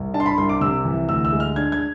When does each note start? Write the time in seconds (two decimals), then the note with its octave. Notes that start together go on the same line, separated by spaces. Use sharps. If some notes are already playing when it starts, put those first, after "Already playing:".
Already playing: C2
0.14 D4 A5
0.20 C6
0.26 B5
0.38 C2 C6
0.49 D6
0.61 C3 E6
0.85 E3
1.09 D2 E6
1.25 E6
1.33 G#3
1.40 F6
1.56 D4 G#6
1.72 G#6